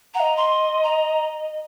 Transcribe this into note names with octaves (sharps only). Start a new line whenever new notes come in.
F#5 A#5
D#5
C6
A#5